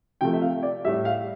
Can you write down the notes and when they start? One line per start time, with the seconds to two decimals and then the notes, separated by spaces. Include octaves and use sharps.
0.21 C3 F3 A3 G5
0.33 E5
0.42 F5
0.63 D5
0.85 A2 G3 E5
1.05 F5